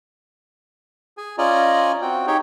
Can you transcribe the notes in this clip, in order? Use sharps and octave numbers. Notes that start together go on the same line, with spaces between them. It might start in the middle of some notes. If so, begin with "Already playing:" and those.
G#4 G#5
C#4 F4 D5 D#5 G#5 A#5
C4 F#4 G5
D#4 G4 G#4 C#5 G5